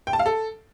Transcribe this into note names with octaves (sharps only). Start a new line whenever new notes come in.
G5
A5
F5
A4